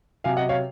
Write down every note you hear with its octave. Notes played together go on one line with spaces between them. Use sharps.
C3 F#3 F5 G#5
D#5 F#5
C#5 F5